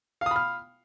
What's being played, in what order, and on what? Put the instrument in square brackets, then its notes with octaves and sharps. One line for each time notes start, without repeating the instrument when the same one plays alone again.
[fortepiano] F5
D#6
B5
F6